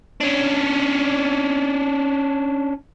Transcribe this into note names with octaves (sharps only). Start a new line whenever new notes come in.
C#4 D4